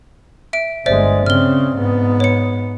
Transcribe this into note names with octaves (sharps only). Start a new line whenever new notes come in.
E5 D7
G1 G#3 C5 D5 E5
C#3 C4 F6 G7
G#2 B3
C#5 C#7